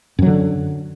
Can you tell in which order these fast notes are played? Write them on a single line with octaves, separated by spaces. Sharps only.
F#2 F#3 D3